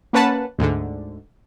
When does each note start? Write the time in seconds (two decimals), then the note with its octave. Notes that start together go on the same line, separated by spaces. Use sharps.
0.13 A#3 C#4 B4 F#5 A5
0.59 D2 G#2 D3